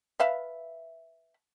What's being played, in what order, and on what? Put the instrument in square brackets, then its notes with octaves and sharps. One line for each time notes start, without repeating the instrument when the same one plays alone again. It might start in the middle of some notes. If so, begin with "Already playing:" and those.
[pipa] B4 E5 F5